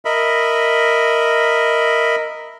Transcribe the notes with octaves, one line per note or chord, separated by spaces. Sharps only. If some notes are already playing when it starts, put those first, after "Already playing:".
A#4 D#5 E5 B5